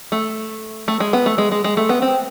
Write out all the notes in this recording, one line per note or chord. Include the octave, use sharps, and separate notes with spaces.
A3
A3
G#3
B3
A3
G#3
G#3
G#3
A3
B3
C4